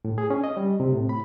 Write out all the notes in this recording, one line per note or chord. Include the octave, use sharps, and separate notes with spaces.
A2
G#4
C#4
D#5
G3
C3
A2
B5